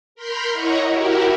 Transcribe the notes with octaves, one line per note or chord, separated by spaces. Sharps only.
A#4 B5 C6 F6 G6
E4 C#5 D#5 F#5 A#5 C#6
E4 F#4 G4 A#4